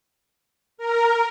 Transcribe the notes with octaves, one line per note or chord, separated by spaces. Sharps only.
A#4